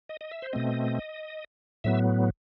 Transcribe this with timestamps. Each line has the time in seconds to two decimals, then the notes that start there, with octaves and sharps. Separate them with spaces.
0.09 D#5
0.21 D#5
0.31 E5
0.42 C5
0.53 B2 A3 C4 D#5
1.84 A2 F#3 B3 E5